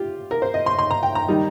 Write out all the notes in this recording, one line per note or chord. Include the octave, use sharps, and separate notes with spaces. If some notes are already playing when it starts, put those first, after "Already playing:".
Already playing: F4 G4
A#4
C5
D#5
C6
C6
A#5
G5
A#5
D#3 G3 D#4